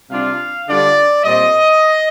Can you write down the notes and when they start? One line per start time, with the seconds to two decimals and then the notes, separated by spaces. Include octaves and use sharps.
0.10 C3 G3 D4 F4 F5
0.68 D3 G3 D4 F4 D5
1.24 A#2 G3 C4 D#5